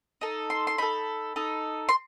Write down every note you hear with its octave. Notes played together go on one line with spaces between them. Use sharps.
D#4 A4
C6
C6
D#4 A4 B5
D#4 A4
C6